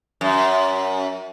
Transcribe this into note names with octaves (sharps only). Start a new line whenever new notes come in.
F#2